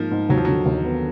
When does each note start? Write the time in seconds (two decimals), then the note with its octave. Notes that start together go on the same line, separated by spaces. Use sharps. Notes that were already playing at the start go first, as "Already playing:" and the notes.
Already playing: G#2 F3 A#3
0.11 G#2
0.29 D#2 F#3
0.37 F3
0.45 D3 F#3
0.66 D#2
0.84 B3